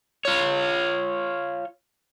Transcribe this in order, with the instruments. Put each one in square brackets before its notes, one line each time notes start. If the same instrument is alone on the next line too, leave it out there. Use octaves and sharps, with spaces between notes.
[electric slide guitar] F4 C#5